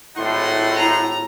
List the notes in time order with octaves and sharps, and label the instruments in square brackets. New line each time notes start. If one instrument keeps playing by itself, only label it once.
[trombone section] G#1 A2 [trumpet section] D#4 F#5 C6 [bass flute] E4
[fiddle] A#5